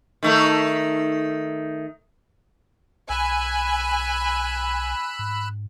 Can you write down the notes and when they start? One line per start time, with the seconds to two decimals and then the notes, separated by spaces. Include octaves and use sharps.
0.23 D#3 A3 A#4
3.10 B1 G#5 B5 E6 F#6
5.19 G#2